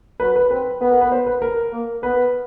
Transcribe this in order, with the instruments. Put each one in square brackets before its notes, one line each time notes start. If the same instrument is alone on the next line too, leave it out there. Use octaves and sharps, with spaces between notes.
[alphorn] F#3 [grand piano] B4
[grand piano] B4
[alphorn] C4 [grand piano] B4
[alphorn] B3 [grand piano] B4
[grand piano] A#4
B4
C5
B4
A#4
[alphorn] A#3
[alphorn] B3 [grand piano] B4